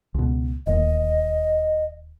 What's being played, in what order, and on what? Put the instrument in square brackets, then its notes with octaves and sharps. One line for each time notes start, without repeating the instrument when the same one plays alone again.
[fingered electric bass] C#2 B2
[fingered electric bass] D1 D#2 [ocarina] D#5